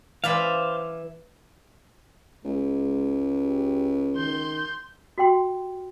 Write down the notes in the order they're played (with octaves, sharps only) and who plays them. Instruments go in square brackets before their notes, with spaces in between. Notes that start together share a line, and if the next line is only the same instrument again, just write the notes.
[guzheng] E3 D5 B5 [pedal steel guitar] C5 F5
[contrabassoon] C#2 [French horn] G#3
[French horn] G4
[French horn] D#3 [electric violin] C6 G6
[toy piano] F#4 G4 G5 C6